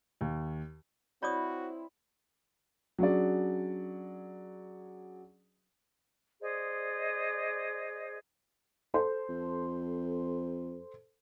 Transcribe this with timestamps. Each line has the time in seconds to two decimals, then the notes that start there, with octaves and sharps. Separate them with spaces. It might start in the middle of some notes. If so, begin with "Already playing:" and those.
0.21 D#2
1.23 C4 E4 F#4 C#5 D5 B5 D#6
2.99 F#3 C#4 D4 F#4 G#4 D5
6.40 G#4 C5 D5 D#5
8.94 A4 C5
9.29 F2